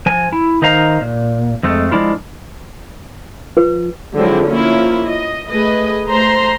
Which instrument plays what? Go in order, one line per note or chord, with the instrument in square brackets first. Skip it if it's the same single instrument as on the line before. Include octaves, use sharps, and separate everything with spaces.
[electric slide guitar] F3 G#5
E4
D#3 D#4 C5 D#5 F5 A#5
A#2
F2 G#3 A3
F3 G#3 D4 E4 F4
[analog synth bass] F3 [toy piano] B4
[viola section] D3 F3 F#3 G#3 C4 E4
F3 A#3 C#4 E4 F4
D#5
A3 G#4 B4 D#5
A3 C5 A#5 C6